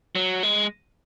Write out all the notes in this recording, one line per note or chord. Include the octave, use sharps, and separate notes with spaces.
F#3
G#3